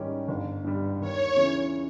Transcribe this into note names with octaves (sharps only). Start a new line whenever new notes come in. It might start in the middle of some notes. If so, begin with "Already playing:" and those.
Already playing: G#2 D#3 G3 C#4 G4
G1
G2 G3
D#2 C#5
C#3 E3